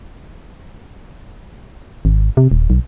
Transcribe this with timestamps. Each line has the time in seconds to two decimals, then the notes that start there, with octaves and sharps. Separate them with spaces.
2.05 G#1
2.37 C3
2.52 D#1
2.70 B1